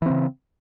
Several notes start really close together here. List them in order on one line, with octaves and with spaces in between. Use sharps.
E3 C4 C#3